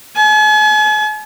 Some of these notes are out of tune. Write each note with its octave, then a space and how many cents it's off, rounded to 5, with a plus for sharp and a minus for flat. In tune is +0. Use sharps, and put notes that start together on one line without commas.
G#5 +45